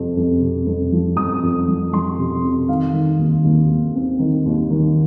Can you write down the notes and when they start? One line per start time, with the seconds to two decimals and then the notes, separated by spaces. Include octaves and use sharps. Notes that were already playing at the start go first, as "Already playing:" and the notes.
Already playing: F2 C3
0.17 F2
0.42 C3
0.66 F2
0.92 F3
1.17 F2 D#6
1.43 F2
1.68 F3
1.93 F3 C6
2.19 C3
2.43 C3
2.69 D#3 F5
2.93 D#3
3.19 D#2
3.45 D#2
3.70 D#2
3.95 C4
4.19 D#3
4.46 D#2
4.71 D#3